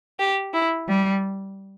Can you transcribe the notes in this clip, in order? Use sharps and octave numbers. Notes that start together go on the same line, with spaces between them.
G4
E4
G3